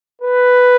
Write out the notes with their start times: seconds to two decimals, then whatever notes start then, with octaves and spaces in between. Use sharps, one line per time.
0.21 B4